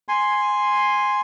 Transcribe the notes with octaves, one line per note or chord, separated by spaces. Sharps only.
G#5 C6